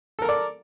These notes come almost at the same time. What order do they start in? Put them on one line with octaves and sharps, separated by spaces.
A4 A#4 A#5 D5